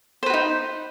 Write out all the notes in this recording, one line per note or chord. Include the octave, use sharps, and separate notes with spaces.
D#4 F#4 B4 C5